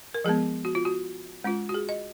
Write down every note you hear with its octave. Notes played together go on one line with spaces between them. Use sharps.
A#4
F3 G#3 B3 G#4
F#4
F4
F#4
G#3 C#4 F4
F#4
G#4
D#5